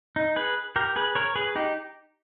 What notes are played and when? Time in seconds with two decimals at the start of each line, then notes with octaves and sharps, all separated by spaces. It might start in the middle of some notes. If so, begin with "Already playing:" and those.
0.16 D#4
0.36 G#4 B4
0.76 G4 A#4
0.96 G#4 B4
1.15 A#4 C#5
1.36 G#4 B4
1.55 D#4 G4